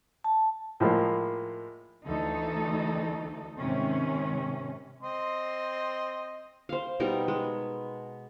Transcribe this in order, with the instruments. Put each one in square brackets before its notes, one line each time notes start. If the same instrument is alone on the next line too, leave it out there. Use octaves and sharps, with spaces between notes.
[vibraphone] A5
[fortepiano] A2 F3 G#3 A#3
[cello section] D2 E3 D#4 A4
G#2 C3 D#3 C#4
[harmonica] C4 D#5 C6
[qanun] C5 F5
B2 G3 D#4 A#4
G#3